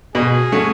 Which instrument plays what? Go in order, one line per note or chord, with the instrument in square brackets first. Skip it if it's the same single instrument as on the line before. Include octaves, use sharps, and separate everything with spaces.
[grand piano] B2 [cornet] G#4
[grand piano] A3 C#4 F#4